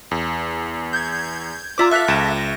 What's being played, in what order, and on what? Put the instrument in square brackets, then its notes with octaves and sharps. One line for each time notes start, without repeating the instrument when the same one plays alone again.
[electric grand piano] E2
[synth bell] G6 G#6
[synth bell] F4 D6 [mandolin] D5 E5 A#5
[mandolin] A4 F5 [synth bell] E5 F#6 B6
[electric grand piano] C#2 E7 [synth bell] A#6